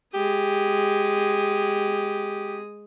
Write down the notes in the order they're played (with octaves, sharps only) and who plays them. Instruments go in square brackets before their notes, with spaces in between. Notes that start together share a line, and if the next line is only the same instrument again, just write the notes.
[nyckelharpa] G#3 D#6 [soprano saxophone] G4